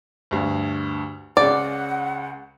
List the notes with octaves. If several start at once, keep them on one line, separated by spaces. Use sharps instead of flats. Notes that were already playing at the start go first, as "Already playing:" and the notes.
D2 G2
C#2 C#3 D5 F#5